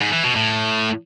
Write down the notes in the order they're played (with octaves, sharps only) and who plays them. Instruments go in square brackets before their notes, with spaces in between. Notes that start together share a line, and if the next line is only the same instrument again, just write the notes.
[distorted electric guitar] G#2
E3
B2
A2